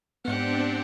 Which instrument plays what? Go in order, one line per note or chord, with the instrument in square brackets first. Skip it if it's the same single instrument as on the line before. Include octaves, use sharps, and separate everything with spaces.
[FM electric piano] G#2 B3 [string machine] C4 D4 [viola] G4 F#5